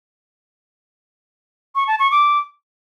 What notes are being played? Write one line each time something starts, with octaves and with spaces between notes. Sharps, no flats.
C#6
A5
C#6
D6